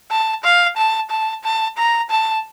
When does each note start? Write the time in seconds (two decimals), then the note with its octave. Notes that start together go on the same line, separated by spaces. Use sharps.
0.11 A5
0.44 F5
0.77 A5
1.10 A5
1.44 A5
1.77 A#5
2.10 A5